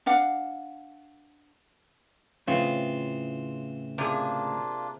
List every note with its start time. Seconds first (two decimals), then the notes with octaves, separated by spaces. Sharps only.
0.06 D4 F5 F#5
2.48 A2 C#3 E3 C4 F4 C#6
3.98 C3 A#3 D4 F4 G#4